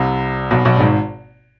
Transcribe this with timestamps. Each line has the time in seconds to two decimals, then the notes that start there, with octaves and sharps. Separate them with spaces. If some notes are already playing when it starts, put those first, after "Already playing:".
Already playing: C2 C3
0.51 B1 B2
0.65 B1 B2
0.76 G2
0.80 G#1 G#2